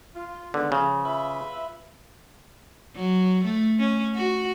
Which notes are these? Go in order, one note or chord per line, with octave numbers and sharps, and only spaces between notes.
F4
D3 D#3 G#3 B3
C#3 F3
F4 B4 E5
F#3
A3
C#4
F#4